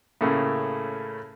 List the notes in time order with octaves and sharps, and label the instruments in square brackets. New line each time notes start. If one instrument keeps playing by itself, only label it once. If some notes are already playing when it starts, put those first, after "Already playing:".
[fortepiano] A2 C#3 A3 A#3